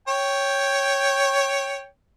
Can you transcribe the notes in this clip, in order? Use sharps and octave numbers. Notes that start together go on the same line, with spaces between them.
C#5 G5